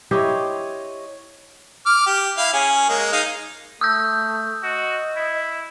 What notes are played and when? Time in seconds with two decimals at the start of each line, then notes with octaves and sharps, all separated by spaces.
0.11 E4 G4 C5 C#5 D#5
1.86 D6 F6
2.07 G4
2.37 E4 F5
2.53 C#4 G#4
2.89 G#3 A#3
3.12 D#4 F5
3.81 A3 D#6 E6 G6
4.63 F#4 D#5
5.16 E4